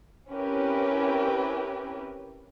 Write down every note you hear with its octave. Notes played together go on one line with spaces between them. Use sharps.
C4 C#4 E4 G4 A#4 B4